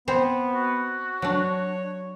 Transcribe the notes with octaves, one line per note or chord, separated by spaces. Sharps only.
B3 C4 C5
F#4
F#3 D4 C#5